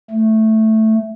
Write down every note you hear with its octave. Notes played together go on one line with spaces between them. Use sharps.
A3